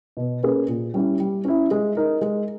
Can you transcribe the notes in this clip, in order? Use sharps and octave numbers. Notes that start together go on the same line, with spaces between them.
B2
A#3 C#4 G#4 B4
A#2
G3 C#4 E4 G4
G3
C#4 E4
G#3
D#4 A#4
G#3